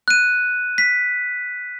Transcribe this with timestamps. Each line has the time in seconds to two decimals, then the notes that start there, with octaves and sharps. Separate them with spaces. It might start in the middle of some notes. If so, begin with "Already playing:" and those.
0.08 F#6 D#7
0.78 B6